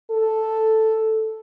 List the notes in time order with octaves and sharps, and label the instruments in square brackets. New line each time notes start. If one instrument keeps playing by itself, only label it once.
[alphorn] A4